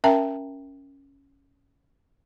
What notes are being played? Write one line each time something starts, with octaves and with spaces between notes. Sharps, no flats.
C#4 A#4 E5 G5 A5 A#5